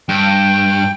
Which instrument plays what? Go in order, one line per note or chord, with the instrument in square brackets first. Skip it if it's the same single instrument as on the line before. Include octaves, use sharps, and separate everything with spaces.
[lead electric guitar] G2 [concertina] G5